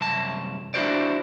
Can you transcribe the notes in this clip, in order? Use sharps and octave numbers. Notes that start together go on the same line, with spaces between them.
C2 F#2 A5
D4 E4 F#4 C5 D5